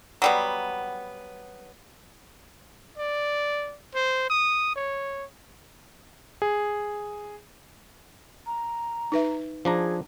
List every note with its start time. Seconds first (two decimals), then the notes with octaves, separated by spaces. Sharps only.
0.22 F#3 G3 B3
2.98 D5
3.95 C5
4.30 D#6
4.76 C#5
6.42 G#4
8.46 A#5
9.12 D#4 B4 E5
9.65 F3 D4 G#4 A#5